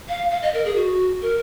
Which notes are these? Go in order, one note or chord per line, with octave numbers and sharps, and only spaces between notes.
F5
F5
D#5
A#4
G#4
F#4
A#4